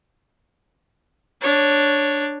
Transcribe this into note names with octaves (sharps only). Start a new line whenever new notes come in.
D4 C#5